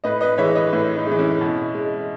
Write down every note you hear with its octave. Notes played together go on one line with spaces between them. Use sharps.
A2 B4 D#5
B4 D#5
E3 G#3 C#5 E5
B4 D#5
A2
D#4
E3 G#3
C#4 E4
B2
G#3